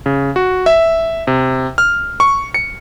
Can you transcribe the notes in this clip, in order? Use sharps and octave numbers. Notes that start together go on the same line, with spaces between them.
C#3
F#4
E5
C3
F6
C#6
C#7